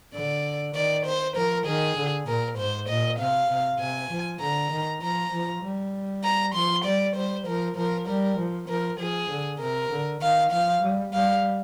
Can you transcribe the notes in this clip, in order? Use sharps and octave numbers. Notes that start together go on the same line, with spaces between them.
D3 D5
D#3 D5
C5
F3 A#4
D#3 G#4
D3
A#2 A#4
G#2 C5
A#2 D#5
C3 F5
C3
C3 G#5
F3
D3 A#5
D#3
F3 A#5
F3
G3
A#5
F3 C6
G3 D5
G3 C5
F3 A#4
F3 A#4
G3 A#4
F3
F3 A#4
F3 G#4
D3
C3 A#4
D3
D#3 F5
F3 F5
G3
G3 F5